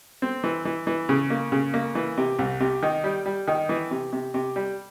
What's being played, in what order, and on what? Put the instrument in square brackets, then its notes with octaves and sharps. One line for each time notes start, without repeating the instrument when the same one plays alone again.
[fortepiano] C4
E3
E3
E3
C#3
A#3
C#3
A#3
E3
C3
C2
C3
D#3
G3
G3
D#3
E3
C3
C3
C3
G3